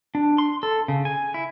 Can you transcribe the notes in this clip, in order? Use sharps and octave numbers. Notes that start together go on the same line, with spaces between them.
D4
C6
A4
C#3
G#5
E4